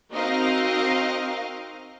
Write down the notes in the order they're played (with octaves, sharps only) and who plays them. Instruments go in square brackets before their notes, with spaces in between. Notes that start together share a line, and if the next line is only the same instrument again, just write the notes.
[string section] C4 D#4 F#4 A#4 D#5 F5